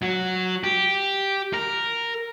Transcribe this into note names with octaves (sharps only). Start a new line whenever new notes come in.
F#3
G4
A#4